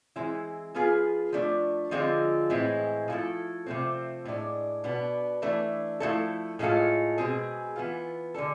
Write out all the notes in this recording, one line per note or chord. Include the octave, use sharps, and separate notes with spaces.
E3 G#3 C4 E4
F3 B3 F4 G#4
F3 A3 D4
D3 F3 G#3 C4 F4
A2 E3 G#3 C4 E4
F3 A3 E4 A4
C3 F3 A3 C4
A2 G#3 D4
B2 B3 D4
E3 A3 D4
F3 A3 E4 A4
A2 G#3 C4 F4 A4
B2 G#3 C4 G#4
E3 B3 F4
D3 G#3 D4 A4